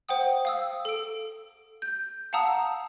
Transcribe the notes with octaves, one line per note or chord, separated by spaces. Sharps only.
C5 F#5 G5 D#6
F5 D#6 E6
A4 D7
G6
F5 F#5 A5 A#5 D#6 E6